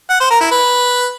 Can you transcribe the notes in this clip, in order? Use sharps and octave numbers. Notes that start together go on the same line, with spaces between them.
F#5
C5
A#4
E4
B4